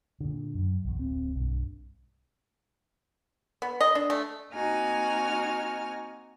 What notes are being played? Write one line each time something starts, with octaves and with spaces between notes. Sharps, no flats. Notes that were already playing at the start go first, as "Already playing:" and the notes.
A#2 D3
F#2
A#1 E2
D1 C4
B1 G2
B3
D#5
D4
A3
A#3 C4 D#4 F#4 G#5 F6